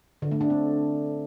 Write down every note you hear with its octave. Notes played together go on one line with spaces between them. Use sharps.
D3
A3
D4
C4